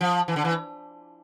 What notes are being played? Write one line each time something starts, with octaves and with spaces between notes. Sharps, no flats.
F3
E3
D3
E3